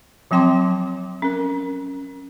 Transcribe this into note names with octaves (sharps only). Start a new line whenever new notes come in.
F3 F#3 C4 G5 C6 D6
C#4 A#4